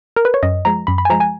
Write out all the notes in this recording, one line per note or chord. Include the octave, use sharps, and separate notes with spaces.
A#4
B4
C#5
F#2 D#5
F3 G#3 A#5
F#2 B5
B5
G#5
F3 G#3 A#5
G#5